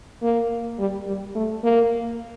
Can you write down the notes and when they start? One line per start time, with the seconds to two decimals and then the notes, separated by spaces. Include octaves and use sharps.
0.23 A#3
0.79 G3
1.07 G3
1.35 A3
1.64 A#3